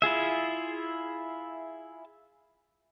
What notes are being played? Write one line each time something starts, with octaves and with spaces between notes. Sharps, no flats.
E4 F4 G#4 E5